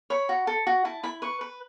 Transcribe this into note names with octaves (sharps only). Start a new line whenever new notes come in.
C#5 B5
F#4
A4
F#4
E4 A5
E4 B5
B4 C#6
B4